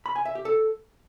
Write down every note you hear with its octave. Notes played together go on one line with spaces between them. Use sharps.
B5
G#5
E5
G4
A4